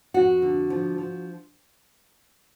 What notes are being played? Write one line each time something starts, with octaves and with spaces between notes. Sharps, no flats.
F2 F#4
D3
F3
F3